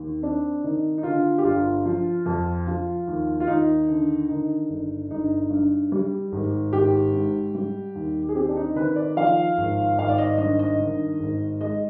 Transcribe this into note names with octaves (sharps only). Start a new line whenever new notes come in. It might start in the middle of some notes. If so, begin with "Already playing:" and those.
Already playing: D#2
C4 D4
D#3 D#4
D#4
D3 F4
G4
G1 F4
F3
F2
F3
D#2
F4
D#2 D#4
D3
D#3 D#4
G1
G1 D#4
G2
G3
G#1
G#1 G4
G#2
G3
D#2
G#4
C4 G4
D4
D#4
D#3 B4
D5
F3 F5
G#1
G#1 F5
D5
D#5
G2 D#5
D#5
D#3
G#1
G#3 D#5